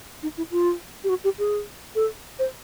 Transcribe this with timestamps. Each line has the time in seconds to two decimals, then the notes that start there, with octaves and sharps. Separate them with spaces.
0.23 D#4
0.37 E4
0.51 F4
1.04 G4
1.09 F#4
1.24 G4
1.39 G#4
1.95 A4
2.39 C5